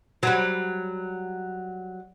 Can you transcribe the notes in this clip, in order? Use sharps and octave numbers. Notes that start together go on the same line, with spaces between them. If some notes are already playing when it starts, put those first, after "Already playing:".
F#3 G3